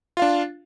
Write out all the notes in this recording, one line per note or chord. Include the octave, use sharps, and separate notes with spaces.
D4 F4 F5